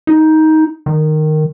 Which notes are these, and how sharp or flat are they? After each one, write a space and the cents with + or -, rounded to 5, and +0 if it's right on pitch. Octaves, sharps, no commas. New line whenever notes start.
D#4 +15
D#3 -10